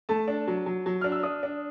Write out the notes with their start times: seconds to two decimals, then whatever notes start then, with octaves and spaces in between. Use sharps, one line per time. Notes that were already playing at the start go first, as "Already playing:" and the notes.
0.09 A3 A5
0.28 D4
0.47 F#3
0.66 F#3
0.86 F#3
1.01 D4 F6
1.12 E6
1.23 D4 D#6
1.43 D4